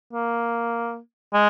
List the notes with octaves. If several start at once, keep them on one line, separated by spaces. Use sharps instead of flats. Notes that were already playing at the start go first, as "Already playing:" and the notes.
A#3
G#3